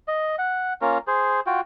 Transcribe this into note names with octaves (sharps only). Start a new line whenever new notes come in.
D#5
F#5
A#3 C#4 F4 A#4
G#4 C5
F4 F#4 G5